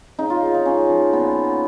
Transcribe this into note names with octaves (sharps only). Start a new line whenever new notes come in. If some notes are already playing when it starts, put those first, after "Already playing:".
C#3 D#4
F4
C#3
D#4
G#3 C#4
F3
A#2 B3